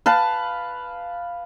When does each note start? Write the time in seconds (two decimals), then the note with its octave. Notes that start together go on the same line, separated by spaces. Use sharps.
0.06 B4 F5 A5